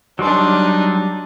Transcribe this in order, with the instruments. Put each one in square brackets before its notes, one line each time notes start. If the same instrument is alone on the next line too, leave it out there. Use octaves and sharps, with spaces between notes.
[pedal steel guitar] F#3 G3 C6 [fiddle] D4 D#4